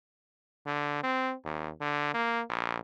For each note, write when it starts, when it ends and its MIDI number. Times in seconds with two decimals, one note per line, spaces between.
0.66 1.02 50
1.03 1.33 60
1.45 1.70 39
1.81 2.11 50
2.14 2.41 58
2.49 2.80 34